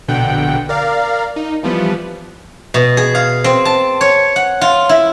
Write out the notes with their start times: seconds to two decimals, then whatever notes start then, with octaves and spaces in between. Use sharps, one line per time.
0.08 A#1 B2 D3 F#5 G5
0.69 A#4 D5 F5
1.36 D#4
1.63 E3 F3 G3 B3
2.74 B2
2.97 G#4
3.15 F5
3.44 C4
3.65 A5
4.01 C#5
4.36 F#5
4.61 F4
4.89 E4